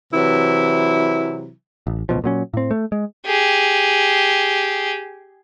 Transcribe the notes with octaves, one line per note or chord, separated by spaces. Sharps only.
C3 E3 F#3 E4
A1
D1 A1 B2 F3
A#2 F#3 C#4
A2 C4
A3
G#3
G4 G#4